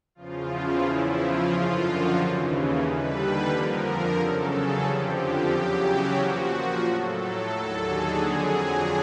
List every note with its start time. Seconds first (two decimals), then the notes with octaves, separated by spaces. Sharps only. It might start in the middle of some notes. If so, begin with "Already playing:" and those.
0.15 E2 C#3 F3 F4
0.49 E4
0.82 E2 C#3 F3 E4
1.16 F4
1.49 F#2 D3 F3
1.82 F#4
2.16 D#2 C#3 E3
2.82 D#2 D3 G3 B4
3.49 F2 D3 F3 A#4
4.17 E2 C#3 F#3 A4
4.50 G#4
4.83 F2 D3 F3 G4
5.17 G4
5.50 E2 C#3 F#3
5.84 F#4
6.17 A#2 F3
6.84 A2 F#3 A4
7.17 A4
7.52 D#2 D3 F#3
7.84 G#4
8.18 F2 D3 F#3